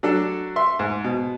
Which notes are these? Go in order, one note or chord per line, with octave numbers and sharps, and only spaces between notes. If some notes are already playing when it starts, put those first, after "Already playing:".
F#3 D4 A4
E5 C6
G#2
B2